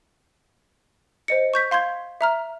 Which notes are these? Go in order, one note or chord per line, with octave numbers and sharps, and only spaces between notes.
C5 D#5 C#7
C#6 G6 B6
F5 C6 G6 G#6
E5 A#5 F6